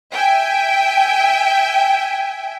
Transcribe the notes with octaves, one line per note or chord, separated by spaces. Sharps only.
E5 G5 G#5